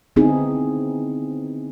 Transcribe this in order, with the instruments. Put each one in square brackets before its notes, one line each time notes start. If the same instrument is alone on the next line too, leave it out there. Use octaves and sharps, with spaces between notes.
[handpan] D3 B3 C4 D#4 E4 G#4